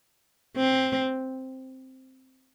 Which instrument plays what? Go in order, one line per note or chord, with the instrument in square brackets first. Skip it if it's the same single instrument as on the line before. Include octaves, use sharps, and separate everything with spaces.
[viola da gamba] C4